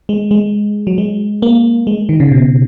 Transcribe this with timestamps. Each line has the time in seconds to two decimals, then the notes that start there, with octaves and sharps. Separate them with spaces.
0.09 G#3
0.31 G#3
0.87 F#3
0.98 G#3
1.42 A#3
1.87 G#3
2.09 D#3
2.20 C#3
2.32 B2